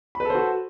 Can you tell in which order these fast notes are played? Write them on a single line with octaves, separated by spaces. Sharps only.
B5 B4 A4 C5 F#4